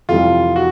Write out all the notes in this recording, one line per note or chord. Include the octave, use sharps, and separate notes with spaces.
F2 C3 E3 G3 F4
F#4